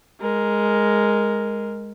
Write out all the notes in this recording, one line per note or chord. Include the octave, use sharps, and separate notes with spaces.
G#3 A#4